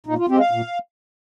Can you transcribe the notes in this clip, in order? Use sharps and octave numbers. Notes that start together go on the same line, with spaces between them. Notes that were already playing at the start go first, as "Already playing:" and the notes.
A#2 D#4
F4
G#3 C4 G4
F5
A#2